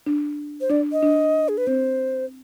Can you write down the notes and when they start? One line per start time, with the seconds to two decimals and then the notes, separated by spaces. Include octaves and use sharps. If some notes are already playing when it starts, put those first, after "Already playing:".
0.06 D4
0.61 C5
0.70 D4 D5
0.92 D#5
1.03 D4
1.49 G#4
1.58 B4
1.67 C4 C5